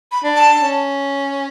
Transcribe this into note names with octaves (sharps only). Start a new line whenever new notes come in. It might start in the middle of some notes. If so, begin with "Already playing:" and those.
B5
D4
A5
C#4